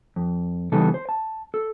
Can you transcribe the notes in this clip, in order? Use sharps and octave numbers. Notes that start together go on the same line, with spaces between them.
F2
C#3 E3 G3 B3 D#4 A4
C5
A5
A4